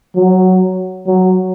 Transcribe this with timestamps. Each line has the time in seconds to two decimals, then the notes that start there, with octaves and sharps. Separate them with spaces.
0.16 F#3
1.07 F#3